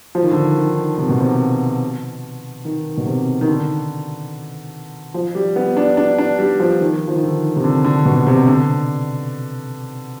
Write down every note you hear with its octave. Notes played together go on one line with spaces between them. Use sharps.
F3
D#3
D3
D#3
D#3
C3
B2
C3
D#3
B2
C3
D#3
D3
F3
G3
B3
D4
D4
D4
G3
F3
D#3
F3
D#3
D3
C3
D3
D3
B2
C3
D3